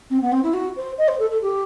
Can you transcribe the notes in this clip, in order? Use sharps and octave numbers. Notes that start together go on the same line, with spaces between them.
C4
B3
C4
E4
F#4
C5
D#5
C5
A4
A4
G4